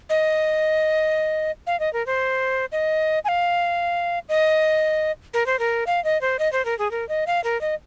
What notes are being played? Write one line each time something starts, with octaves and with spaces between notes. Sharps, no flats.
D#5
F5
D#5
A#4
C5
D#5
G#5
F5
D#5
A#4
C5
A#4
F5
D#5
C5
D#5
C5
A#4
G#4
A#4
D#5
F5
A#4
D#5